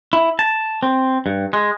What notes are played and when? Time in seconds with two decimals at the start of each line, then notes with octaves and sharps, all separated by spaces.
0.13 E4
0.39 A5
0.83 C4
1.26 G2
1.53 G#3